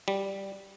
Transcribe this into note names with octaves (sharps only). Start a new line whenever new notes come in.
G3